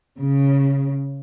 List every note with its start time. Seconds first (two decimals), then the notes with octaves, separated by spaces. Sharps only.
0.19 C#3